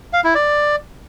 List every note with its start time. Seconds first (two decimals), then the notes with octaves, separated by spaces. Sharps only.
0.13 F5
0.24 E4
0.35 D5